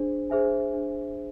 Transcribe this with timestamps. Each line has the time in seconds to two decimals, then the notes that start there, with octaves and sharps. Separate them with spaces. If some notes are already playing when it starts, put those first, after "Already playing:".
Already playing: D4 G#4 C5
0.30 G#4 C5 E5 G#5
0.73 D4
1.16 G#4